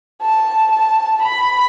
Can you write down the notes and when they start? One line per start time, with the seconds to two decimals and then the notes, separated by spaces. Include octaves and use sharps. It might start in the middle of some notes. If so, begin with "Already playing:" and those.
0.22 A5
0.72 A5
1.23 B5